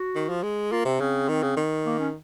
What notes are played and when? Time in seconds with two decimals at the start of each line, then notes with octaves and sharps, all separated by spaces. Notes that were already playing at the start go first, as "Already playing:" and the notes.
Already playing: F#4
0.15 D#3
0.29 F3
0.43 G#3
0.72 A#3 F4
0.85 C3 C4
1.00 C#3 C4
1.29 D#3
1.43 C#3
1.57 D#3
1.86 A#3
1.99 C#4